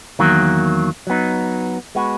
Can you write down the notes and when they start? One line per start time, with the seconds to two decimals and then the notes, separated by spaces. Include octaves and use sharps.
0.19 E2 D#3 F#3 A#3
1.07 F#3 B3 D#4
1.95 G#3 B3 F#4